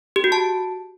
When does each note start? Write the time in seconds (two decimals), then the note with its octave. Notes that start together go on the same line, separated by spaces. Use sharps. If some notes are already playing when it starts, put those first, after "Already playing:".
0.16 G4
0.24 F#4
0.32 A5